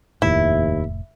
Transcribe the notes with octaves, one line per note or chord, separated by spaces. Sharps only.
F1 D#2 A2 E4 E5